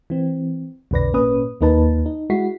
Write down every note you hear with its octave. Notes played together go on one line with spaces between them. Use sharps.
E3 C4
B1 F2 D3 B4 D5 A#6
G#1 A#2 A#3 C#4 B4 D#6
D#2 A#3 D#4 B4 A5
D#4
G#3 E4 F#4 B6 C7